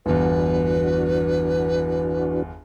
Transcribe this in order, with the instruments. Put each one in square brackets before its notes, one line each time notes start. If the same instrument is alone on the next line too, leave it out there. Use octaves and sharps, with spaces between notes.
[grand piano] G1 E2 [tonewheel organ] E3 D4 F#4 [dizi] B4